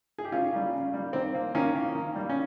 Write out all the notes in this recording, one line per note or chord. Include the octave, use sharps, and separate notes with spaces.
G#4
G4
C#3 C#4 F4
G3 A#3
C#3
G3 A#3
D#3 C4
A#3
D#3 A#3 C#4
A#3
D#3
G3 A#3
C#4